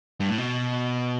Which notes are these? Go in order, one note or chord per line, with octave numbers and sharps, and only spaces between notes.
G2
A2
B2